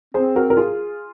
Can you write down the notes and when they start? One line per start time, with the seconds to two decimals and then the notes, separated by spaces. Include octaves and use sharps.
0.14 C4 G#4 C5
0.36 F#4 A#4
0.50 A#4
0.57 F4 G#4